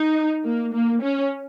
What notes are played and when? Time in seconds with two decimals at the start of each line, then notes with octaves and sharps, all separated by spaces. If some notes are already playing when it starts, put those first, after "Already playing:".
Already playing: D#4
0.44 A#3
0.73 A#3
1.02 C#4